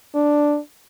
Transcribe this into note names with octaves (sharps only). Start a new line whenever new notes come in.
D4